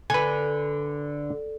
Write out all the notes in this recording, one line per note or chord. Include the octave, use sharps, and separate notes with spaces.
D3 B4 G#5